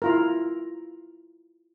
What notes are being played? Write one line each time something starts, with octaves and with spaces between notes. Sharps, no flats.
E4 F4 A#4